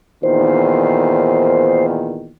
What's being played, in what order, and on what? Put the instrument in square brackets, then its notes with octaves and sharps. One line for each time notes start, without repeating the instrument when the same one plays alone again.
[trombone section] E2 A#2 D#3 [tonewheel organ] C5